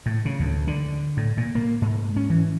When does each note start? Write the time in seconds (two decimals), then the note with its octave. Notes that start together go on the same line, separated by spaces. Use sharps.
0.06 A2
0.25 C#3
0.40 D2
0.67 D3
1.17 A2
1.37 A#2
1.55 A#3
1.82 G#2
2.16 C#4
2.30 E3